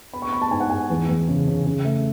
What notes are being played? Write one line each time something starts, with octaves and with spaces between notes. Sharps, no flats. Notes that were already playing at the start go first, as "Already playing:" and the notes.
B3 B5
C#6
B3 B5
A5
G#2 G#5
F#5
G#2 G#5
E2
E2
C#3
C#3
C#3
A3